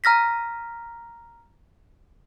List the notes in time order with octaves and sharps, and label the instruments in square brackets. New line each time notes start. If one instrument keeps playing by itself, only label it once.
[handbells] A#5 F6 A#6 B6